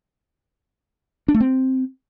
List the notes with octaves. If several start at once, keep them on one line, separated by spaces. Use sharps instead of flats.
D4
A3
C4